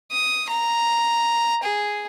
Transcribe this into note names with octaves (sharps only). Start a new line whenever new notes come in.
D#6
A#5
G#4